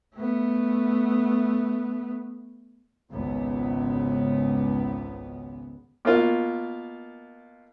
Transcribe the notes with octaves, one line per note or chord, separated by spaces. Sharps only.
A3 B3
G#1 C#2 C#3 B3
B2 A#3 F4